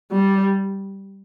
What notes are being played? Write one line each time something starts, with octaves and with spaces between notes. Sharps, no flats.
G3